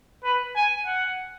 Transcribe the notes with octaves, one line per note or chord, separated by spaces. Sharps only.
B4
G#5
F#5